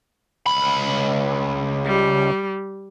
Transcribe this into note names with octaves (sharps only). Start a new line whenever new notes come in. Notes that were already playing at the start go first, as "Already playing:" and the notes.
C#2 B5
G3